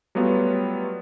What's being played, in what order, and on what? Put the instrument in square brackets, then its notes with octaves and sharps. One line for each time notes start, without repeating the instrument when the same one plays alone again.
[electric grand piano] F#3 G3 A3 B3 F4 F#4